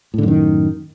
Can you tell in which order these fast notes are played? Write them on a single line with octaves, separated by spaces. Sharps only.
A2 D3 F#2 D#3